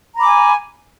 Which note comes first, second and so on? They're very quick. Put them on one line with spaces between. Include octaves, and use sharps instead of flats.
A#5 B5 D6 G#5